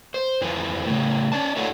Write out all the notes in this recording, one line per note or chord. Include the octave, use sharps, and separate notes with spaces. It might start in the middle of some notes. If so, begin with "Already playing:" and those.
C5
F2 E3 F3
A2 C#3
C#4 D5 A5
D4 E4 F#4 A4 C#5